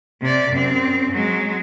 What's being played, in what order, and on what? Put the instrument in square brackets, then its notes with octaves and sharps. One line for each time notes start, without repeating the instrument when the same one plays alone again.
[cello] C3 D5
F#2 C4
F#3 G#3